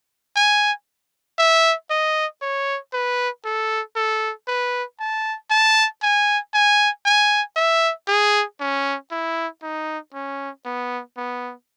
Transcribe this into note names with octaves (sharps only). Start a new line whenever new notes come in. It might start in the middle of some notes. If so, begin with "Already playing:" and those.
G#5
E5
D#5
C#5
B4
A4
A4
B4
A5
A5
G#5
G#5
G#5
E5
G#4
C#4
E4
D#4
C#4
B3
B3